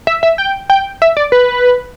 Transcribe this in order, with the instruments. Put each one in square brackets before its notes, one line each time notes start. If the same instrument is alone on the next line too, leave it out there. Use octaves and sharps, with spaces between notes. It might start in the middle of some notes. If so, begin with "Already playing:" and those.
[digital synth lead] E5
E5
G5
G5
E5
D5
B4